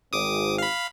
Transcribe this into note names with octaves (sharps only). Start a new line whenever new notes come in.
G#1 D6 D#6
F5 B5